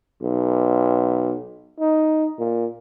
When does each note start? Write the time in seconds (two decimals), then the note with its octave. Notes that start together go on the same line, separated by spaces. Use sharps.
0.22 B1
1.80 D#4
2.39 A#2